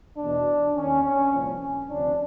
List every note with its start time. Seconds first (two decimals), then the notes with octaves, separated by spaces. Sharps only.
0.17 E2 B2 D4
0.75 D#2 D#3 C#4
1.04 C#4
1.33 C2 A#2 F3 C#4
1.89 D2 C3 F3 D4